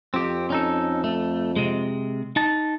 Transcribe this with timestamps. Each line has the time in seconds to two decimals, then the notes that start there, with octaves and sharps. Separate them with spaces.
0.14 F2 C4 G4
0.50 C#4 D#4 A4
1.04 A3
1.56 C3 G#3
2.36 D#4 A5